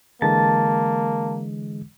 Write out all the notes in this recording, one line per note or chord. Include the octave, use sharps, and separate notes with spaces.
D3 E3 G#3 A#3 A5